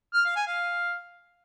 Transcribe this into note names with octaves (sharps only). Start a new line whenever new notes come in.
F6
F5
G#5
F5